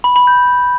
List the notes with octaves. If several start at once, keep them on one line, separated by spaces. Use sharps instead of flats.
B5
B5
G6